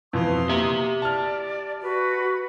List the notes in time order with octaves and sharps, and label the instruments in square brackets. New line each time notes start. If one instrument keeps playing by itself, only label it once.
[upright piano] F2 B2 E3 [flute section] C6 C#6 D#6
[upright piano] A#3 [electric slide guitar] G4 E5
[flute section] D5 [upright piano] A5 F6
[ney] F#4 [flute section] B4